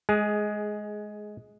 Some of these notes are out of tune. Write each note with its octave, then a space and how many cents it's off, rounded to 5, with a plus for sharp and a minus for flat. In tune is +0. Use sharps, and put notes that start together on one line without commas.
G#3 +15 G#4 +0